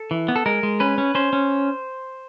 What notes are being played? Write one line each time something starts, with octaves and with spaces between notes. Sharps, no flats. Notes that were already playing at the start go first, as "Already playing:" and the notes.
Already playing: A4
E3
B3
A4
G#3 A#4
G#3
C#4 B4
C#4
C#4 C5
C#4